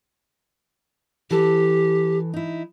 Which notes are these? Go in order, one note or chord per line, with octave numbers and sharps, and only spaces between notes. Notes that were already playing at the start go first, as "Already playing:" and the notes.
E3 G4 A4
D#4 E4